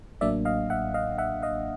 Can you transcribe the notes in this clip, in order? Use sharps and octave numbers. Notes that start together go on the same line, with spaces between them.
A1 A2 F#3 A#3 D4 D5 E5
D#5 F5
E5 F#5
D#5 F5
E5 F#5
D#5 F5